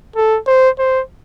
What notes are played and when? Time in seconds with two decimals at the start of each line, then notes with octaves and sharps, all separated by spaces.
0.16 A4
0.47 C5
0.79 C5